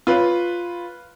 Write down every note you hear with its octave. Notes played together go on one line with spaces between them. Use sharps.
F4 B4 C#5